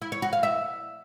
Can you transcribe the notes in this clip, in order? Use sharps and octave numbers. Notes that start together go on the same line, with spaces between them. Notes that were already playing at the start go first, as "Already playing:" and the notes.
E4
C#5
F#4
F5
E5